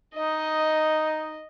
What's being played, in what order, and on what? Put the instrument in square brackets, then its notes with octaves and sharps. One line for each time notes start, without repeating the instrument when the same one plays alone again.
[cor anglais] D#4 [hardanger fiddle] D#5